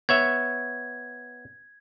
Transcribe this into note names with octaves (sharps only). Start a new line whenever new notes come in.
B3 C#5 E5 G#6